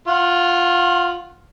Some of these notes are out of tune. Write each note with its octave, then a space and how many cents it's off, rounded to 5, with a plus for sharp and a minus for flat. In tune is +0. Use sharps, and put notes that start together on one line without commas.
F4 +0 F#5 +0 C6 +40